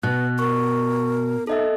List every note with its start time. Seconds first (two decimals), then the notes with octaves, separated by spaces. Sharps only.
0.03 B2 B3 F#6
0.39 A#4 C#6
1.47 D#4 A4 D#5 E5